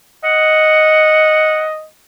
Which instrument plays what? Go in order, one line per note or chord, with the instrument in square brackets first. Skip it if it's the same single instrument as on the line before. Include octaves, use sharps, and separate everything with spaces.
[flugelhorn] D#5 [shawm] F#5